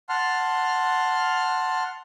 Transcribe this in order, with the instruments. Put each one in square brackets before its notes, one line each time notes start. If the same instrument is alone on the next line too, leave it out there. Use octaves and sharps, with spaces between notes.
[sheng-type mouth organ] F#5 A5 C6 F6